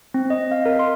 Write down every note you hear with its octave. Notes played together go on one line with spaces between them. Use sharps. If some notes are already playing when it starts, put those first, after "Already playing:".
C4
D#5
F5
A#4
C6